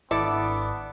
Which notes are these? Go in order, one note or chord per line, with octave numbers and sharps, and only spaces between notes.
G#1 B3 D4 E4 A4 D5 D6